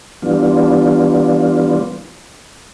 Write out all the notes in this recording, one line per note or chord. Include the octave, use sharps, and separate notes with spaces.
E3 G3 B3 D4 F4